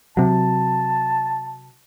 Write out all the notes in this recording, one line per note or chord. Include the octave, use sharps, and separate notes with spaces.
C3 F#3 A5